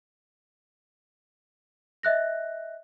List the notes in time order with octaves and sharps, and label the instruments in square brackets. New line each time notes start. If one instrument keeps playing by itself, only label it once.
[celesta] D#5 E5 F#6 A#6